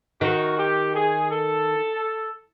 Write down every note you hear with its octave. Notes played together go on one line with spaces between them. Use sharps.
D#3 F#4
G4
G#4
A4